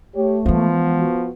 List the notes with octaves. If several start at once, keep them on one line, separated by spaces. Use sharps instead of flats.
A3 G4 C#5
E3 F3 G#3 B3
F#4